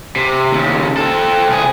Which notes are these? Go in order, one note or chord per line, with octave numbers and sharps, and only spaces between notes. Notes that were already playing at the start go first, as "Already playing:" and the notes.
C3
D#2 C#3
C4 A4
C2 G#4